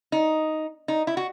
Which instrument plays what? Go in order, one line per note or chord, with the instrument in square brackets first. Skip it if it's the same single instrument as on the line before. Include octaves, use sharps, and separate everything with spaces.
[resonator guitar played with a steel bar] D#4
D#4
E4
F#4